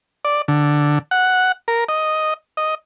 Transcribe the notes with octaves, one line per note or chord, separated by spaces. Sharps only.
D5
D3
F#5
A#4
D#5
D#5